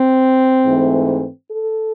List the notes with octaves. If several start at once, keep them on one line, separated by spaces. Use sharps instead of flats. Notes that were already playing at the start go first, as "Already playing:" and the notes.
Already playing: C4
G#2 E3 A3
A4